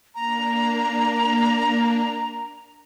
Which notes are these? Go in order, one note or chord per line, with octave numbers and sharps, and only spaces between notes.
A#3 D4 A#5